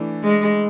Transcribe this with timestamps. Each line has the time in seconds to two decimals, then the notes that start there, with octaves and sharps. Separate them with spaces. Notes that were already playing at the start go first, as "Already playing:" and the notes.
Already playing: E3 A3 D4
0.24 G#3